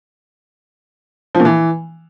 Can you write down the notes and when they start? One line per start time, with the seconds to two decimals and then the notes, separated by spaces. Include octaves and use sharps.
1.35 F3
1.40 A#2
1.45 E3